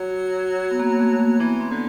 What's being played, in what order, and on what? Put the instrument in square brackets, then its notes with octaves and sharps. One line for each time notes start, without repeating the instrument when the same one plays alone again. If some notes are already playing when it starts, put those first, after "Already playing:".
Already playing: [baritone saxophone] F#3
[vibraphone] B3
A#3
A3
A#3
[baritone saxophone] E3 [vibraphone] B3
[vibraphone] C4
[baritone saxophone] D3